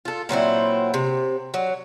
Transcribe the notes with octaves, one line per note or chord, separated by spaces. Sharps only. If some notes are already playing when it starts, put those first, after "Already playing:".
F4 A4
A#2 F#3 C4 E4
C3
F#3